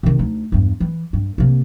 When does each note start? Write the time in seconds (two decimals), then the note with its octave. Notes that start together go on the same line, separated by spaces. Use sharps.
0.03 C3 D#3
0.19 D2 D#4
0.52 E2 G2
0.80 E3
1.13 G2
1.38 C3 A#3